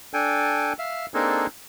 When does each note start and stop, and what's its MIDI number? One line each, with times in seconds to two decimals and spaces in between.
0.14 0.73 62
0.14 0.73 69
0.14 0.73 79
0.14 0.73 80
0.79 1.06 76
0.79 1.06 77
1.14 1.47 58
1.14 1.47 60
1.14 1.47 62
1.14 1.47 63
1.14 1.47 68
1.14 1.47 69